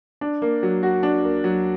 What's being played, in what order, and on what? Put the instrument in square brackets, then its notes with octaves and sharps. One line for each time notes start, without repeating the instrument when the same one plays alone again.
[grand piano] D4
A#3
F#3
F#4
D4
A#3
F#3